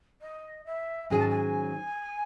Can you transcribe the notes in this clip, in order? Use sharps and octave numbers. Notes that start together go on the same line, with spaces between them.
D#5
E5
G#2 D#3 F#3 C#4 G#4 G#5
A5
G#5